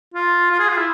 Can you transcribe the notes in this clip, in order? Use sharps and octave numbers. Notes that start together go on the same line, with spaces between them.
F4
F4
G#4
F4
E4